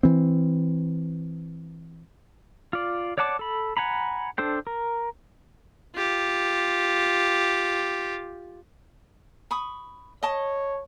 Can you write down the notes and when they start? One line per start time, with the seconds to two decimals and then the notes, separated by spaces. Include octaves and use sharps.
0.03 E3 C4
2.73 F4 D5
3.18 C#5 D5 F#5 A5 D6
3.39 A4 B5
3.77 F#5 G#5 A#5 B5
4.38 D4 A4 C5 G5
4.67 A#4
5.95 F4 G4
9.51 B5 C#6 D#6
10.23 C#5 D#5 A5